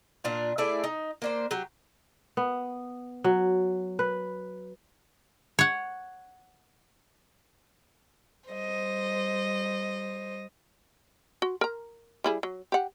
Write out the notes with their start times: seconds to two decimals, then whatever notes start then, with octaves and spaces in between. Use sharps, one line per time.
0.24 A#2 D4 F4
0.58 A3 E4 G#4 D5
0.84 D#4
1.22 A#3 D4 C5
1.51 F#3 G4
2.37 B3
3.24 F#3
3.99 B4
5.59 C#5 F#5
8.49 G3 C5 D#5
11.42 F#4
11.61 A#4 A#5
12.24 G3 E4 G#4
12.43 F#3
12.72 G4 F#5